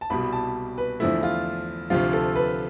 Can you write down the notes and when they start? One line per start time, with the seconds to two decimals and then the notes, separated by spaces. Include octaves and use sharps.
0.01 A5
0.10 C2 B2 G3 B5
0.33 A5
0.78 B4
1.00 E2 D3 F3 A3 E4
1.23 F4
1.90 D2 C3 F3 F4
2.13 A4
2.36 B4